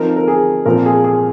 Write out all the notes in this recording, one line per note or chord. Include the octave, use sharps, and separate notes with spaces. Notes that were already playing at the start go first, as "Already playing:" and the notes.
Already playing: F3 C4 D#4 A#4
A#4
G#4
A#2 F3 C4 A#4
G#4
G#4